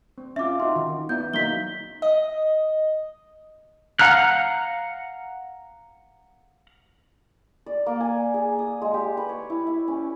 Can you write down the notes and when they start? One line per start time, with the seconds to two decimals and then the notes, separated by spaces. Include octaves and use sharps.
0.18 C4
0.36 C#4 F4 E5 D6
0.60 D#4 F#4 C6
0.76 D#3
1.09 B3 E4 G6
1.34 F#3 A#3 D#4 B6 G7
2.02 D#5
3.99 F5 F#5 A#5 F6 F#6
7.66 D5
7.86 A#3
8.00 G#5
8.34 G#4
8.59 D#6
8.82 G#3
8.94 G4
9.17 B4
9.29 C#5
9.50 E4
9.67 E5
9.88 C#4